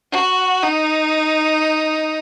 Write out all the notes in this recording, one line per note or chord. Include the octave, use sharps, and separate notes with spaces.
F#4
D#4